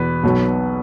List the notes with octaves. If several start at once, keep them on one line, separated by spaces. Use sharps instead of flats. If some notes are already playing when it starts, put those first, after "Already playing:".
Already playing: E2 B2 B4
B1 B2 F#3